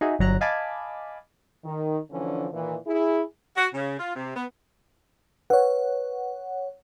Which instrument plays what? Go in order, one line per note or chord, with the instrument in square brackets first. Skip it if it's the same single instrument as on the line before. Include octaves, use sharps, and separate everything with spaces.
[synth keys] D#4 F#4 G#4 E5
G1 F#3 A#5 F#6
D#5 F5 G#5 A5 B5 D6
[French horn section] D#3
D3 E3 F3 C#4 D4
A#2 D#3 E3
E4 G#4
[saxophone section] F#4
C#3
F4
C3
B3
[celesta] B4 [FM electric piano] C#5 F#5